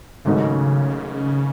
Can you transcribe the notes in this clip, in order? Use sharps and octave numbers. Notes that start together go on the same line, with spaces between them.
G#1 G#2 C#3 F#3 A3 D#4